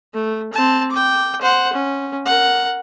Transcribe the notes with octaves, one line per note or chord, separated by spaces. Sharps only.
A3
C4 A5
G5 D6
C5 F#5
C#4
A#4 F#5